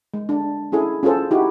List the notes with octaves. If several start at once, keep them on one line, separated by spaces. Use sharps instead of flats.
G#3
D4
C#4 E4 G#4 A4
C#4 F4 G#4 A4 C5
D#4 E4 F#4 G4